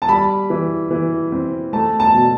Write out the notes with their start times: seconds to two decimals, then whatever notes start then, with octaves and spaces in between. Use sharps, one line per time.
0.02 A5
0.09 G3 B5
0.50 E3
0.91 E3
1.32 C4
1.73 A3 A5
2.00 A5
2.14 B2